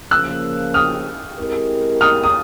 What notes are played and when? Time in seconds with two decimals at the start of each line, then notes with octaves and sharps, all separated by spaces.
0.11 C#3 F3 A#3 E6 F#6
0.74 D#6 F6
1.38 G#3 C4 E4 G4 A#4
2.01 D#6 F6
2.23 D#6